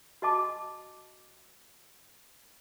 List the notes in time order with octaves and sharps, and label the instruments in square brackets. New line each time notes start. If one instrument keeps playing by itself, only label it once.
[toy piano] F#4 D#5 A5 D6